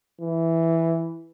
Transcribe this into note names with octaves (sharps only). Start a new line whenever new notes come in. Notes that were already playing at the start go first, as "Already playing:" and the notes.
E3